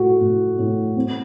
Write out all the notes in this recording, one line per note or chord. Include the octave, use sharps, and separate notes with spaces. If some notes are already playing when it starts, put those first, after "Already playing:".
Already playing: A2 A3 F#4
A2
A2
C4